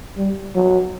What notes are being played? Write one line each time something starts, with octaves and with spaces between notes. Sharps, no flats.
G3
F#3